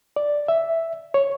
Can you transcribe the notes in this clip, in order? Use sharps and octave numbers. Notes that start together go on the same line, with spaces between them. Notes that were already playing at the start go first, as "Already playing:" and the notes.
D5
E5
C#5